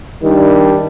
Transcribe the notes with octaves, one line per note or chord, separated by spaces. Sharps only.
D#3 G3 D4